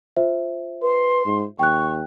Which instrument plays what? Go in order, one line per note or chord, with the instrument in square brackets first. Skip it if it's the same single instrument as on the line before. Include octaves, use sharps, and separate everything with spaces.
[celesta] F4 C5 E5
[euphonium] B4 [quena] C6
[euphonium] G#2
[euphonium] D#2 [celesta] G5 F#6 [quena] C#6